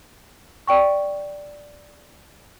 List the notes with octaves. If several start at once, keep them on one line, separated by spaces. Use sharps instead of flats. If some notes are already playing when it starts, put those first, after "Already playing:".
D5 G5 C#6